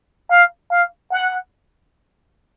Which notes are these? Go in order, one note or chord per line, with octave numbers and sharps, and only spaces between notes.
F5
F5
F#5